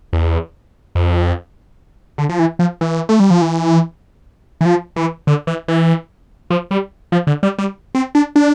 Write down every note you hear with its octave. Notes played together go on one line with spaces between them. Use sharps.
E2
F2
D3
F3
E3
F3
E3
A3
G3
F3
E3
E3
F3
E3
D3
E3
E3
F3
G3
F3
D3
G3
G3
C4
D4
D4